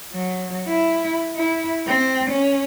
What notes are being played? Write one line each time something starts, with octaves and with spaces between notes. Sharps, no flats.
F#3
E4
E4
C4
C#4